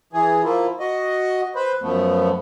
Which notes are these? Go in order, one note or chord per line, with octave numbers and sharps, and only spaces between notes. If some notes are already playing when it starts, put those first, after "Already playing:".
E3 G#4
F3 A#3 E4 F4
F#4 D#5
B4 C5
F#2 F3 A3 B3